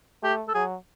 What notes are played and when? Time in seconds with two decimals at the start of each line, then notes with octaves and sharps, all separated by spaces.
0.23 A3 G4
0.48 A4
0.54 F#3 G#4